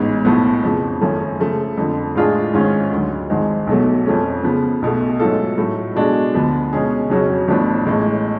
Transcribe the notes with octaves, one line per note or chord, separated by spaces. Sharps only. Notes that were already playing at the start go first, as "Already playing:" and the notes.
Already playing: A1 G#2 G#3 B3
B1 A2 F3 B3
F2 C#3 F3
G#1 F#2 F3 A3 C#4
C#3 F3 A3
F2 D3 F3
A2 G#3 D4 F4 G#4
G#1 G#2 G#3 C#4 F4
D2 D3 F#3
G#1 G#2 F3 G#3
B1 B2 F#3 A3
F2 F3 A3 C#4
C#3 F3 B3
B1 B2 A3
G#2 F#3 A3 F4 A4
A2 F#3 A3
B2 G#3 D4 F#4
D2 D3 F3 B3
B2 G#3 C#4 G#4
F2 C#3 F#3 C#4 F#4
A1 A2 F3 B3 D4
A1 A2 G#3